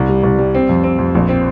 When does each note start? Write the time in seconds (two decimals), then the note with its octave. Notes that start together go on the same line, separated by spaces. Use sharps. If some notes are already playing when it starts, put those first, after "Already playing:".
Already playing: C2
0.09 G3
0.23 C2
0.38 G3
0.55 C4
0.69 F2
0.84 C4
0.99 F2
1.15 A#1
1.29 C4